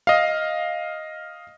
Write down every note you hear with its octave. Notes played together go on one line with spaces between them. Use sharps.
D#5 F5